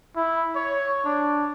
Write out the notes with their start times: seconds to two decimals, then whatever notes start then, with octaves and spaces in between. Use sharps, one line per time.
0.16 E4
0.56 C#5
1.05 D4